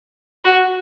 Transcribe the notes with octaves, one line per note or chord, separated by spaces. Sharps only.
F#4